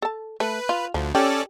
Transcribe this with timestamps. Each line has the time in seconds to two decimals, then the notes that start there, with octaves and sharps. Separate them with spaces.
0.02 A4 A5
0.40 A3 B4
0.69 F4
0.94 D2 F3
1.15 C#4 G4 A4 D5